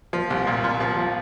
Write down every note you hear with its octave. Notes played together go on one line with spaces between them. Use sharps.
F3
C2
A#2
A#2
F3
F3